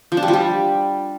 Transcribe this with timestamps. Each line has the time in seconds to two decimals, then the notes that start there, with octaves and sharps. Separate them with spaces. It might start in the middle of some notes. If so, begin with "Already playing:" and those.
0.12 F3
0.17 D4
0.23 G3
0.28 F3
0.33 G3